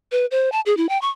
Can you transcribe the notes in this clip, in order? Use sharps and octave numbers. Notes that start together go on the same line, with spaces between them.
B4
C5
A5
G#4
E4
G5
C#6